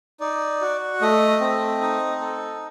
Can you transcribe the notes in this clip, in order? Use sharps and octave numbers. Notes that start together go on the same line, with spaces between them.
D#4 D5
F#4
A3 D#5
C4
D#4
A4